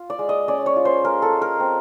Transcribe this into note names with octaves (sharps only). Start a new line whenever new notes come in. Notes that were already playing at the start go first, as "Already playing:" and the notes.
Already playing: F4
D5
G#3
D#5
C#4 D5
C#5
F4
C5
G#3 A#4
A4
G#3
A#4
C4